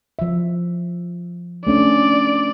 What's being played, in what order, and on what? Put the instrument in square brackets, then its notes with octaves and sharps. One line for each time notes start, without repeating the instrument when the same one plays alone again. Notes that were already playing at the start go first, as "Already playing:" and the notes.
[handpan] F3 E5
[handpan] A3 C#4 D4 [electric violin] D5